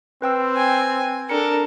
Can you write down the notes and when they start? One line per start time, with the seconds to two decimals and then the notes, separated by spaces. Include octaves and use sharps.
0.22 C4 B4 G5 E6
0.56 G#5
1.29 D4 A4 A#4 C#7